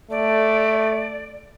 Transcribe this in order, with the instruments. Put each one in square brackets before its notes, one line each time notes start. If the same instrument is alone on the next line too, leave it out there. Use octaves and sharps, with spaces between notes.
[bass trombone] A3 [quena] D5